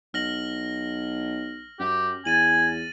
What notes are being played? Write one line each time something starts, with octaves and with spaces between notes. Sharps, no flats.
B1 F6 A#6 F#7
F#2 G4
E2 G#5 A6 D#7 F#7